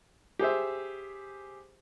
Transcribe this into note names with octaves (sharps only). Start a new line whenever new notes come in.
G4 G#4 C5 E5